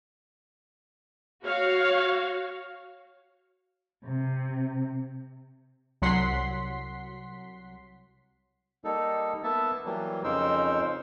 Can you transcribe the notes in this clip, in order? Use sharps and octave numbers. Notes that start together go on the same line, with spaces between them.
F#4 C#5 F5
C3
C2 F#3 F#5 C6 B6 C7
G3 A#3 D#4 A4
A#3 B3 E5 A5
E3 F#3 G3 A#3
F2 C#3 D#4 A#4 C5 E6